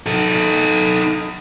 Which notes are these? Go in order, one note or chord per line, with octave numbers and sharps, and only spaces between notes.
D#4 A4